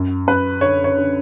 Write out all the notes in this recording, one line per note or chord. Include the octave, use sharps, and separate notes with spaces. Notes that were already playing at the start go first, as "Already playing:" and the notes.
Already playing: F#2
F#2 B4
D3 C#5
C#5
D3